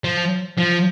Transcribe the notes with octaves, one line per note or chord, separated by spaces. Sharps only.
F3
F3